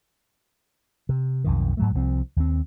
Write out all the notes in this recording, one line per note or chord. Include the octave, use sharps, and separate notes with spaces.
C3
B1 F2 D#3
G#2 F#3 A3
C2 F3 C4
D#2 C4